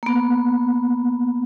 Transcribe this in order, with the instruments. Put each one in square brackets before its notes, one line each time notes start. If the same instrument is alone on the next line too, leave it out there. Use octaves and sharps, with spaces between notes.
[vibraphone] A#3 B3